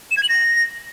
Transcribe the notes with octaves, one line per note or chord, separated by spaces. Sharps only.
E7
G#6
F#7
A#6